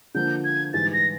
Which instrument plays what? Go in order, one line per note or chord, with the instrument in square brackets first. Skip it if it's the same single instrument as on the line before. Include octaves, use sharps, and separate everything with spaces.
[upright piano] D3 F3 A#3 [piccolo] G6
[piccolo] G#6
[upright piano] G#2 E3 G3 [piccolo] A6
[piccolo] A#6